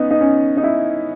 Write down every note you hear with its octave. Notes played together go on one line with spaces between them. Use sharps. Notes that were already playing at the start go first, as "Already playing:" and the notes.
Already playing: B3 C#4 D#4
D#4
C#4
D#4
E4